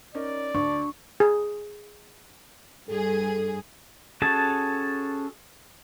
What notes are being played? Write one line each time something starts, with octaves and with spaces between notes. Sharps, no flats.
C#4 D#4 A#4 D5
D2 D4 C#6
G#4
G2 G#4 A4
C#4 F#4 G#4 A4 A5